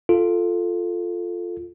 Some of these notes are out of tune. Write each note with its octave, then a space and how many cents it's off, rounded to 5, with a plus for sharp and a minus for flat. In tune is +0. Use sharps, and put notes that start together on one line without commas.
F4 +0 A4 +0